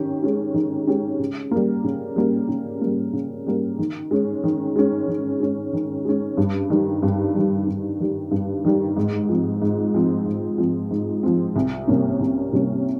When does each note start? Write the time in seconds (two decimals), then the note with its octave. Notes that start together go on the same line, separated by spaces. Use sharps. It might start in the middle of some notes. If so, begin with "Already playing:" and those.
Already playing: D#3 C#4 G4
0.22 G#3 C#4 G4
0.54 D#3
0.87 G#3 C#4 G4
1.19 C#3
1.51 G3 A#3
1.84 C#3
2.16 G3 A#3
2.48 C#3
2.81 G3 A#3
3.13 C#3
3.46 G3 A#3
3.79 D#3
4.11 G#3 C#4
4.44 D#3
4.76 G#3 C#4
5.08 D#3
5.40 G#3 C#4
5.73 D#3
6.05 G#3 C#4
6.37 G2
6.70 D#3 G3
7.03 G2
7.35 D#3 G3
7.67 G2
8.00 D#3 G3
8.31 G2
8.65 D#3 G3
8.97 G#2
9.29 F3 C4
9.62 G#2
9.94 F3 C4
10.26 G#2
10.58 F3 C4
10.91 G#2
11.23 F3 C4
11.56 C2
11.88 C3 G3 A#3 C#4
12.20 C2
12.53 C3 G3 A#3 C#4